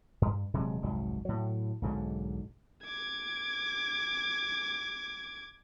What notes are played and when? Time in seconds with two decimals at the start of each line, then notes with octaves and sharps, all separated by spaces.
0.22 G2
0.54 D#1 C3 F#3 G#3
0.82 F1 C2 G#2 F#3
1.25 A2 F#3
1.82 B1 G#2 D3 F#3
2.85 D6 G#6